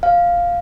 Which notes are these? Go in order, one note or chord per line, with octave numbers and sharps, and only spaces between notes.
F5